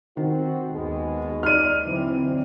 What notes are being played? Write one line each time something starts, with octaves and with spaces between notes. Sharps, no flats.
D#3 C4 F#4
D#2 B2 G#3
D#4 D5 F6 D#7
D3 E3 F#3 C4